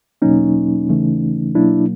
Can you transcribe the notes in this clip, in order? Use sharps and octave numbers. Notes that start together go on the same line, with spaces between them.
E2 B2 F#3 A#3 C#4 D#4
D#2 C#3 E3 A3
B2 F#3 A#3 D4 E4